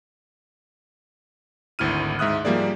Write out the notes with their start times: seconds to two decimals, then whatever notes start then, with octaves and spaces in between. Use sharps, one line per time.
1.79 G#1 D2 E4 F6 D#7
2.19 G#2 E5 D#6 F#6
2.45 F3 G3 A#3 G#4 D5